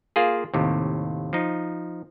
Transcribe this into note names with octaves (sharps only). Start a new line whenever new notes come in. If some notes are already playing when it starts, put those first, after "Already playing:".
A#3 F4 G#4
D#2 A2 C3
F3 D#4